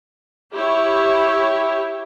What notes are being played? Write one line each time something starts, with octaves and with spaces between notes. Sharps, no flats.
E4 G4 C#5